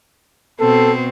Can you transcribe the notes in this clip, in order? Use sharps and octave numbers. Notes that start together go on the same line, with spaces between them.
B2 C4 A4